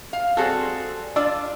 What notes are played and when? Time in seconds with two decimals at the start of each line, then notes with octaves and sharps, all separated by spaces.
0.13 F5
0.37 G3 C4 F#4 G#4 A4
1.16 D4 F4 D5 E6